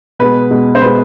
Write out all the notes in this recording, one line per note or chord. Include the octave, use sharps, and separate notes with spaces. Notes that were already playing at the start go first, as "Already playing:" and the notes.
B2 G#3 B4
B2 G#3
C5
B2 G#3 B4